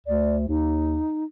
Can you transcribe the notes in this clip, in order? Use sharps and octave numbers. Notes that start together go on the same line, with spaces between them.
D2 D5
D#2 D#4